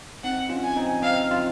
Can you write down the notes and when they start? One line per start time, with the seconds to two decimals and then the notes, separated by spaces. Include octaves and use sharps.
0.24 C4 D#4 F#5
0.49 C#4 F4
0.63 G#5
0.76 C4 D#4
1.02 C4 D#4 F5
1.31 F4